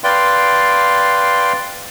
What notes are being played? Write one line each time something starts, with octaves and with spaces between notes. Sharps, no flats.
B4 D5 F5 G5 C6